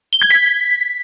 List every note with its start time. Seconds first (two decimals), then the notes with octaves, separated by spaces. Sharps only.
0.13 G7
0.22 G#6
0.30 B6